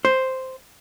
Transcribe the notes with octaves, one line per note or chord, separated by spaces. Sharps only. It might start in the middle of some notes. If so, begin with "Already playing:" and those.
C5